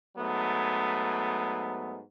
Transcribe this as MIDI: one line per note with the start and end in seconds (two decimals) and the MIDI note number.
0.17 2.02 44
0.17 2.02 54
0.17 2.02 57
0.17 2.02 59